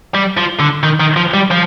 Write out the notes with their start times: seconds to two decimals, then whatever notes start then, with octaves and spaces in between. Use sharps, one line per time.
0.15 G3
0.37 F3
0.60 D3
0.83 D#3
1.00 D#3
1.16 F3
1.34 G3
1.51 F3